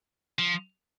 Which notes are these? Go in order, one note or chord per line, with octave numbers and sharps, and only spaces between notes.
F3